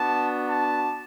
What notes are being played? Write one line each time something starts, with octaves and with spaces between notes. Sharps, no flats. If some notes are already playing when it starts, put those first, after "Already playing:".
Already playing: B3 D4 F#4 A5
A5